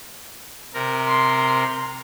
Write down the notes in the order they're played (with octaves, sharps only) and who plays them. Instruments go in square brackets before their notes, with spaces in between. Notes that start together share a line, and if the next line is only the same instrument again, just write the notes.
[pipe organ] C3 A#4
[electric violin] C6